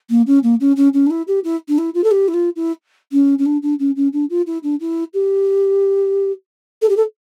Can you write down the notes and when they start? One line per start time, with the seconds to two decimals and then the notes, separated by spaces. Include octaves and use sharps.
0.10 A#3
0.27 C#4
0.43 A#3
0.60 C#4
0.77 C#4
0.93 C#4
1.06 D4
1.10 E4
1.28 G4
1.44 E4
1.68 D4
1.78 E4
1.94 F4
2.04 A4
2.11 G4
2.28 E4
2.34 F4
2.56 E4
3.12 C#4
3.38 C#4
3.46 D4
3.62 D4
3.79 C#4
3.96 C#4
4.13 D4
4.30 F4
4.47 E4
4.63 D4
4.80 E4
5.14 G4
6.82 A4
6.89 G4
6.97 A4